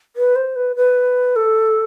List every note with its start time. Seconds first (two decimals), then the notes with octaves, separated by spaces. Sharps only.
0.16 B4
0.36 C5
0.56 B4
0.76 B4
1.36 A4